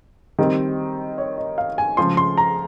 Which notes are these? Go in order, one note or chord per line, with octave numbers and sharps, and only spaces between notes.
D#3 G3 C4
C#5
D#5
F5
G#5
C#3 F3 G#3 C6
C6
A#5